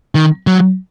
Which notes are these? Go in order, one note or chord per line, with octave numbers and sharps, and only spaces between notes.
D#3
F#3